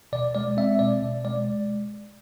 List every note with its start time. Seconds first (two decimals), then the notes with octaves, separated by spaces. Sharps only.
0.13 B2 D5
0.35 G#3 D5
0.57 C4 E5
0.79 B2 D5
1.02 B2
1.25 G#3 D5